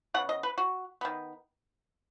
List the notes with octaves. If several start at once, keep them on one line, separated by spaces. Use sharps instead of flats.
C#3 B3 F#5
D#5
B4
F#4
D#3 B3